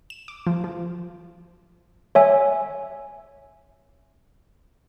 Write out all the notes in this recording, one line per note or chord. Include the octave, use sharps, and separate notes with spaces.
E7
D6
F3
F3
C#5 E5 G#5